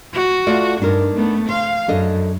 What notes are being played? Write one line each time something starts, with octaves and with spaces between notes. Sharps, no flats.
F#4
A3 F4 D5
G2 D4 D#4 A#4
A3 B3
C5 F5
F#2 D4 A4 D#5